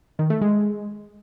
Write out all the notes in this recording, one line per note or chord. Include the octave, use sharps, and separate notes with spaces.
D#3
A3
G#3